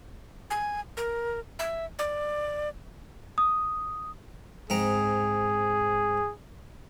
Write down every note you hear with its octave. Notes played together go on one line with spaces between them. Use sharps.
G#5
A#4
E5
D5
D#6
G#2 C4 G#4 A#5